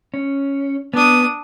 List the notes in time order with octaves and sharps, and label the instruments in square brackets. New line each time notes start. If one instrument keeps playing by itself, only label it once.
[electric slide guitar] C#4
[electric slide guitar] B3 [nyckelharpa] D4 D#6